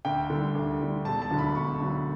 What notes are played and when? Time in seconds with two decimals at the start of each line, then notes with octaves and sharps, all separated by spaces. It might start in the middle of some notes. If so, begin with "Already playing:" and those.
0.05 D2 G5
0.30 D3 G3
0.55 D2
0.80 D3 G3
1.05 E1 A5
1.22 A5
1.30 D2 D3 F#3
1.38 B5
1.55 E1 C#6
1.80 D2 D3 F#3